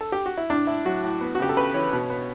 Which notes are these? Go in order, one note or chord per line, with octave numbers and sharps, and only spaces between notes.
A4
G4
F#4
E4
A2 D4
A2 E4
F#3 F#4
A2
B3
F#4
C#3 G4
A4
C#3 B4
E3 C#5
B2
B3